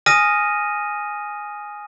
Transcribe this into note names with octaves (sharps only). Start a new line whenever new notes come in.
G#5 D#6 F6 A#6 B6 D#7